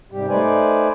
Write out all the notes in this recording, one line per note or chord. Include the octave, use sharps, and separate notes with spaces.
G#2 C3 G3 G4
A3 D#4 B4 C5 D5 G#5